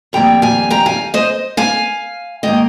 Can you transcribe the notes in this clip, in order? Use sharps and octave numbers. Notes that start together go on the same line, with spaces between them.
F2 D#3 G3 A#3 G5 A#5
F5 G#5
G5 A#5
F5 G#5
C5 D#5
F5 G#5
G#2 D#3 A#3 D#5 G5